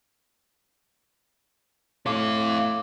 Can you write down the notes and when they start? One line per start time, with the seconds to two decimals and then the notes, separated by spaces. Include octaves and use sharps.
2.06 A2 C4 F5 D6